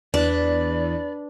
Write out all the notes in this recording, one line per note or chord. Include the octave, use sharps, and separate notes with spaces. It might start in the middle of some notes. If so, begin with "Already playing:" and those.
E2 D4 B4 D5